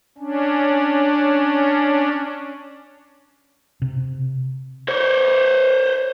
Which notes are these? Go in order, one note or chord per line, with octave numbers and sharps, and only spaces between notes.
C#4 D4
C3
C5 C#5